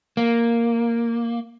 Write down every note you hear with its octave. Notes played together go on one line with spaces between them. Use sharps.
A#3